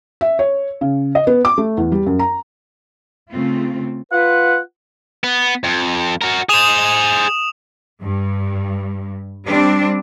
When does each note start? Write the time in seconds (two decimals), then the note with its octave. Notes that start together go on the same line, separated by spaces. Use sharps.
0.21 E5
0.39 C#5
0.81 C#3
1.15 D#5
1.27 B3
1.45 D6
1.58 A3
1.77 E2
1.92 G3
2.06 F#2
2.19 A#5
3.31 C#3 A3 C4 F4
4.12 F4 B4 F#5
5.24 B3
5.64 F2
6.22 F#4 A#4
6.49 G#4 C5 D#6 E7 F7
8.02 G2
9.47 G3 C4 D4